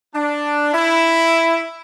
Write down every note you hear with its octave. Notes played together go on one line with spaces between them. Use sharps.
D4
E4